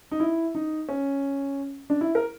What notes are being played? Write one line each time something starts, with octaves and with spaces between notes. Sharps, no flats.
D#4
E4
D#4
C#4
D4
E4
A#4